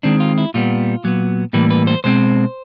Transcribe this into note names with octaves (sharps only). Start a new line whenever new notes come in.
D#3 G#3 C4 D4
F4
E4
A#2 G3 B3 F4
A#2 F#3 B3
A2 E3 G3 A#3 B4
B4
C5
B2 G#3 C4 C5